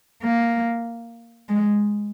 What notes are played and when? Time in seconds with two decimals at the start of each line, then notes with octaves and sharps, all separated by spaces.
0.23 A#3
1.49 G#3